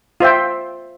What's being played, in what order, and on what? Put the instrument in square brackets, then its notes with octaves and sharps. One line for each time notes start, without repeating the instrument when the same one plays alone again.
[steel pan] F4 C5 E5 G5